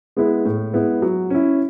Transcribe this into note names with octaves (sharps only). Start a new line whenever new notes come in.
G#3 B3 E4
A2
G#3 B3 E4
F#3
C#4 E4